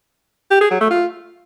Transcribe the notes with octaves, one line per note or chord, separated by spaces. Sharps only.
G4
G#4
F#3
A3
F4